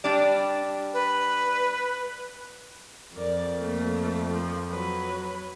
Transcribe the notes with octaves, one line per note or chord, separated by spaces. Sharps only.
G3 D4 D5
B4
F2 A#4 D5
A3 A#3
F3
F#3 B4